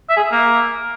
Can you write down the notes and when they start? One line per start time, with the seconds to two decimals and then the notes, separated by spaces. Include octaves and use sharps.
0.09 E5
0.17 G#4
0.24 E5
0.31 A#3